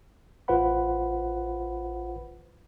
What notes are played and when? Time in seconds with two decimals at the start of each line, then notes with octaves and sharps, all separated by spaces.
0.48 A1 F4 B4 C5 F#5 B5